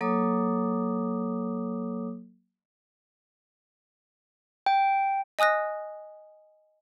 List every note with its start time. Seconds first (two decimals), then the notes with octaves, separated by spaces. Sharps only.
0.01 F#3 A#3 A4 C#5 D6 D#6
4.66 G5
5.39 D#5 G#5 D#6 F#6 A#6